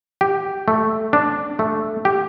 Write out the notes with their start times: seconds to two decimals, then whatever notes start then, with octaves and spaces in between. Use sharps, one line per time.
0.21 G4
0.68 A3
1.13 D4
1.59 A3
2.05 G4